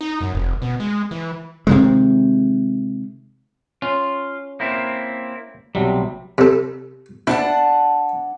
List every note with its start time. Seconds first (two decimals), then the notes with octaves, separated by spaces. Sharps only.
0.01 D#4
0.21 F#2
0.34 F1
0.62 B2
0.80 G#3
1.11 E3
1.67 C3 D#3 G#3
3.82 C#4 F4
4.60 A#3 C4 E4
5.75 B1 C3 F#3 G3
6.38 C3 A4
7.27 D4 E4 F#5 A5